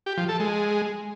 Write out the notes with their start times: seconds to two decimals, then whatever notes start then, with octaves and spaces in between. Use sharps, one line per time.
0.06 G4
0.17 F3
0.29 A4
0.40 G#3